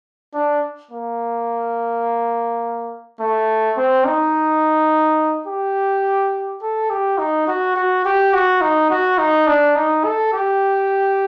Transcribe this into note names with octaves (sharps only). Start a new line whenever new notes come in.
D4
A#3
A3
C4
D#4
G4
A4
G4
D#4
F#4
F#4
G4
F#4
D#4
F#4
D#4
D4
D#4
A4
G4